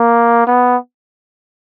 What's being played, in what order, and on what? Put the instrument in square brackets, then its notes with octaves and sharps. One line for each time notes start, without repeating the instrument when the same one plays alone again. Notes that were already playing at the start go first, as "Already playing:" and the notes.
Already playing: [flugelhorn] A#3
B3